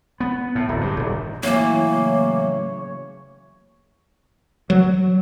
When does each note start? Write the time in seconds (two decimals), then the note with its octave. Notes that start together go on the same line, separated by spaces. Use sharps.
0.20 B3
0.55 A2
0.68 D1
0.81 G2
0.96 D#1
1.43 A2 C#3 E3 F#3 A#3 C#5
4.70 F#3